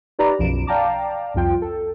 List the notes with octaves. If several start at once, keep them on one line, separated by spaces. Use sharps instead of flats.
D#4 G4 B4 D5 A#5 B5
B1 F#2 F3 D7 E7
D5 F5 G5 A5 A#5 D6
C2 F2 F3 F4 G5
A4